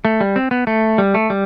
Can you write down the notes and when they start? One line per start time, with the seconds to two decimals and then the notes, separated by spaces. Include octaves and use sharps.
0.05 A3
0.21 G3
0.36 C4
0.51 B3
0.67 A3
0.98 G3
1.14 A3
1.30 G3